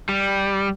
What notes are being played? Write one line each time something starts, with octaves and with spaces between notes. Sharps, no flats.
G3